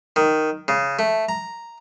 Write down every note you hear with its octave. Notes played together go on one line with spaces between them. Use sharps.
D#3
C#3
A3
A#5